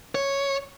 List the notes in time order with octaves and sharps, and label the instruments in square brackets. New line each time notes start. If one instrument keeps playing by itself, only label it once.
[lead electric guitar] C#5